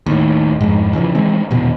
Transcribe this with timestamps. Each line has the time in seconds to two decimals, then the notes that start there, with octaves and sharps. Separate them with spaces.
0.06 D#2 A2
0.61 F2 G#2
0.95 C#3 E3 F3
1.15 E3 G#3 C4
1.51 D#1 E2 B2